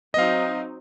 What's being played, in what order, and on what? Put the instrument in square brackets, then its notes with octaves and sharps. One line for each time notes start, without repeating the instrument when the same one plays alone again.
[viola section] F#3 C4 D#4 [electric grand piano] D#5 F5